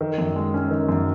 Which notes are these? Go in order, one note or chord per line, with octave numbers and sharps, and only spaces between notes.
D#3
F#2
G#3
C#4
D#3
F#2